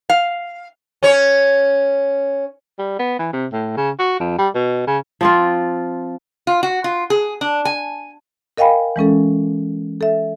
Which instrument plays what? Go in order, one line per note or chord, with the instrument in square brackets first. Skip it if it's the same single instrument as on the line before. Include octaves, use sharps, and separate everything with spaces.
[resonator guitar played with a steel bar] F5
[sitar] C#4 C#5
[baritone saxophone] G3
B3
E3
C3
A2
C#3
F#4
F2
G3
B2
C#3
[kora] F3 C4 F4
[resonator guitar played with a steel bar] F4
F#4
F4
G#4
D4
G#5
[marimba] A#4 D#5 F5 G5 G#5 B5
E3 G#3 C#4 A4
A4 E5